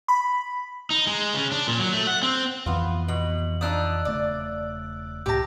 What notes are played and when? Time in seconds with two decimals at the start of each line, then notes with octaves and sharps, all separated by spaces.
0.08 B5
0.90 D#4
1.07 G#3
1.35 C#3
1.52 D4
1.67 A#2
1.79 F#3
1.93 A3
2.07 F#5
2.22 C4
2.66 F2 E3 B3 F4
3.08 B2 F#7
3.61 F3 D4 D#4 D#6 E6 F#6
4.05 E1 C#3 A3 D5
5.26 C#2 A2 C3 G4 A5 D6 A#6